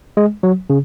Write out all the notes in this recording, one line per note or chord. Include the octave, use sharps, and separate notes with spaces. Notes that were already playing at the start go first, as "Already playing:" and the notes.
G#3
F#3
C#3